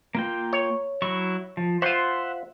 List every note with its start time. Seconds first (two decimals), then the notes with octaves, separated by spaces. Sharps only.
0.15 A#3 F4 G5
0.53 C#5
1.02 F#3 E4 C#6
1.57 F3
1.82 F4 C5 E5 F#5 C6